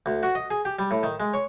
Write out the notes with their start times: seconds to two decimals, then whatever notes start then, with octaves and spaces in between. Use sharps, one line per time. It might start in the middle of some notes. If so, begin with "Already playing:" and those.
0.06 D2
0.23 F#4
0.35 D#5
0.50 G#4
0.65 G4
0.79 G3
0.91 A2
1.03 D#3
1.20 G#3
1.34 C#5